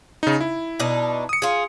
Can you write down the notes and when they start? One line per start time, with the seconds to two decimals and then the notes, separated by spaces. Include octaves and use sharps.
0.23 C#3 D#4
0.41 E4
0.80 B2 D4 D#4
1.29 D#6 C#7
1.42 F4 G#4